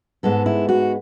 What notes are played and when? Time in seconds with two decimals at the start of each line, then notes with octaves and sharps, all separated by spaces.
0.23 G#2 G#3 B3 A4
0.46 E4
0.69 F#4